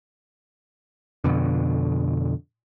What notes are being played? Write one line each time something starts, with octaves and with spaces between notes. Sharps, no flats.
F2 B2 D3